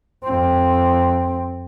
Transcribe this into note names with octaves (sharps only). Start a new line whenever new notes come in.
F2 C4